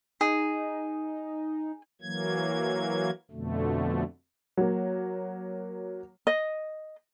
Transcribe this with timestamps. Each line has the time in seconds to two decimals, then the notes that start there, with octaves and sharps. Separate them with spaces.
0.21 D#4 G#4
2.02 E3 F#3 A#3 G#6
3.31 F2 B2 D3 A3
4.57 F#3 A#3
6.27 D#5